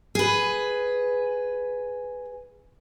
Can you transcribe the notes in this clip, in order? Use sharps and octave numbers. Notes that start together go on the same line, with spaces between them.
G#4 B4